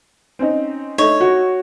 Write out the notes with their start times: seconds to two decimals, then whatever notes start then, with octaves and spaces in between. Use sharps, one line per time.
0.39 C4 C#4 D#4
0.98 A3 D#4 C#5
1.21 F#4